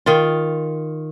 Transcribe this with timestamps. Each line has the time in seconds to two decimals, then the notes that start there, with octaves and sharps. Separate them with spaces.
0.06 D#3 F4